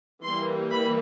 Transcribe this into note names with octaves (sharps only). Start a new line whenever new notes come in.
E3 G3 A#3 C6
B5